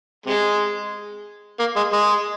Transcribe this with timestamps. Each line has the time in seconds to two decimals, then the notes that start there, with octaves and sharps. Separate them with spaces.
0.26 C3 G#3
1.59 A#3
1.76 G#3
1.93 G#3